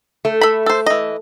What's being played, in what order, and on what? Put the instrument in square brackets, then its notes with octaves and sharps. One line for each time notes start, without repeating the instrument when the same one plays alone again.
[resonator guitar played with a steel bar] A3
[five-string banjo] A4 B5
A4 C5
E3 D#5